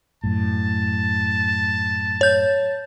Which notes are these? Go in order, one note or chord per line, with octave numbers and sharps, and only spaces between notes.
F#2 A2 A5
C#5 G6